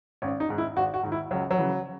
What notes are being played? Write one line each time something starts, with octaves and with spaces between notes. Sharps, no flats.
G#1 C#4
D#4
G#2 D#3
E4
G#1 F#4
F#4
G#2 D#3
E4
C#2 F#3
F#3
C#3 E3